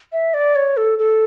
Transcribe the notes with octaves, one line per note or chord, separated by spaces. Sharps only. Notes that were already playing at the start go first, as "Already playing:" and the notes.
E5
D5
C#5
A4
A4